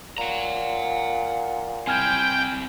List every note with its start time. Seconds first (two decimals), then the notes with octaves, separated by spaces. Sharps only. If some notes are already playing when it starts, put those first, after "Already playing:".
0.18 A#2 F#5 A#5
1.87 C4 E4 G5 G#5 F6 G#6